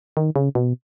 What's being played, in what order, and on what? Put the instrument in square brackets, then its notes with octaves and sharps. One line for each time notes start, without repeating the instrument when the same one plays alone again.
[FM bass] D#3
C#3
B2